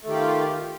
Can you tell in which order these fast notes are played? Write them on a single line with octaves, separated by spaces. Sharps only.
A3 D#3 G4 F4